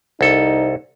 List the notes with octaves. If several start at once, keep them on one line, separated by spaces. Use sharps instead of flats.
C2 D#4 A4